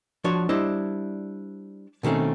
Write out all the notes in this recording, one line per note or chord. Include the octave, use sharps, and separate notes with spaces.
F3 D4 F#4 C#5
G3 D4 E4 C5 D#5
B2 D#3 A3 C4 C#4